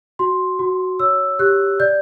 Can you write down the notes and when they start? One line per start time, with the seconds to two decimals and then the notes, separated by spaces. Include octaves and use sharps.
0.19 F#4 C6
0.59 F#4
1.00 C#5 E6
1.39 G4 F#6
1.80 D5 G6